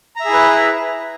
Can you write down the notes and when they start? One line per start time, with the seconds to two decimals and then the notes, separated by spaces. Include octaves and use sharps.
0.16 A#5
0.20 E5
0.25 G#4
0.29 E4
0.33 B4